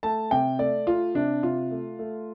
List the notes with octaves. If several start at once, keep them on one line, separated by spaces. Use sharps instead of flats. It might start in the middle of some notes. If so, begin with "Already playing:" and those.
A3 A5
C3 G5
A3 D5
A3 F4
C3 D4
C3 F4
A3
A3